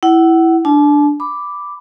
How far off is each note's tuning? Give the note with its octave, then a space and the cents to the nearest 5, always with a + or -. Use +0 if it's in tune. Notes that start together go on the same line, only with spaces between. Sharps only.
E4 +0 F#5 +30
D4 +0 A5 -40
B5 +5 D6 +0